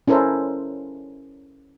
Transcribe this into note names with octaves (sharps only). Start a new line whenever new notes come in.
C#4 E4 A4 A#4 C5